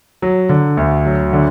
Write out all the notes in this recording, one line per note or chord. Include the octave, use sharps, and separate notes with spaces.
F#3
D3
D2
F#3
D3